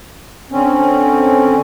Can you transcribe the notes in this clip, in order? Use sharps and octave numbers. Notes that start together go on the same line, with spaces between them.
D3 C4 C#4